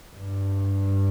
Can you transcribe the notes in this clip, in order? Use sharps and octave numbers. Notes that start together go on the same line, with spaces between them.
G2